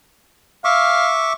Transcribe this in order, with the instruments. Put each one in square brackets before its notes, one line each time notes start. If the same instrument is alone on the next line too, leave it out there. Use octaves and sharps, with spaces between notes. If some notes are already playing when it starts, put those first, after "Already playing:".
[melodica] E5 C#6 D6 [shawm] F5